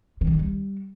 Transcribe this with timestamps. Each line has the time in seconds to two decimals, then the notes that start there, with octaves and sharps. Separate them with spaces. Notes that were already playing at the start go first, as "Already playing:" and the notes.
0.21 D#3
0.27 C3
0.33 D#3
0.39 G3